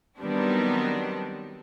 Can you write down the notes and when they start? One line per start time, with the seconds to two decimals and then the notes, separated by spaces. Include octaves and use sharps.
0.19 D#3 F#3 G3 B3 C4 D4